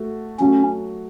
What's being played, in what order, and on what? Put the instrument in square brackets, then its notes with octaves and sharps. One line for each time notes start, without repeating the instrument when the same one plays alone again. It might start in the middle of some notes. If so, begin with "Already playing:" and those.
Already playing: [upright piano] A3 F#4 A4
[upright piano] F#3 A3 F#4 [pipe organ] C#4